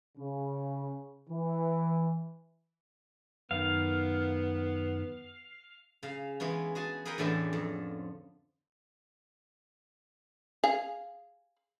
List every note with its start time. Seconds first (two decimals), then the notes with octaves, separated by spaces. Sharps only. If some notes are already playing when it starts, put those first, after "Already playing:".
0.18 C#3
1.29 E3
3.51 F#2 D#3 B3 F5
6.03 C#3 F5
6.40 E3 G#3 B3 C#4
6.75 F#4 G#4 G#5 A5
7.05 G#4 A#4 B4 F#5 G5
7.18 E2 A2 D3 E3 C#4 A5
7.53 F2
10.64 G#4 F5